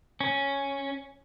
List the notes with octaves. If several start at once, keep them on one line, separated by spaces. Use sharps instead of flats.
C#4